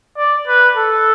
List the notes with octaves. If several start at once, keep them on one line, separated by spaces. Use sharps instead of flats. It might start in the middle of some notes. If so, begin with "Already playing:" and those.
D5
B4
A4